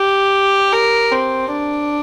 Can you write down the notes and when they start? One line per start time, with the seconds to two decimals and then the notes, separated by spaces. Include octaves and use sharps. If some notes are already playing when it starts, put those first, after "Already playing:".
Already playing: G4
0.72 A#4
1.12 C4
1.52 D4